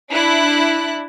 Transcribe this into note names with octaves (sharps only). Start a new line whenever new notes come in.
D4 E4 F#6